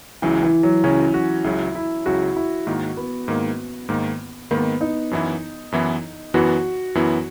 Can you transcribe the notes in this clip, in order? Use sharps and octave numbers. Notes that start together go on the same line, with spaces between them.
C#2 C#3 E3 F#3
E3
F#3
C#2 C#3 F#3 C#4
F#4
C#2 C#3 F#3 E4
E4
C#2 C#3 F#3 F#4
E4
G#2 D#3 A#3 F#4
B3
G#2 D#3 A#3
G#2 D#3 A#3
G#2 D#3 A#3 B3
D#4
F#2 E3 B3 E4
F#2 E3 B3 E4
F#2 E3 B3 E4 F#4
F#2 E3 B3 E4